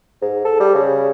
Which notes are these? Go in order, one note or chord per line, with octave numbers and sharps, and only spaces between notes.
G#2
A4
G3
C#3